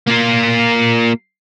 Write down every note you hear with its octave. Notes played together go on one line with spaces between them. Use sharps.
A#3 F4